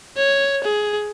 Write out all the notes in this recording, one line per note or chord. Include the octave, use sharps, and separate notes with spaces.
C#5
G#4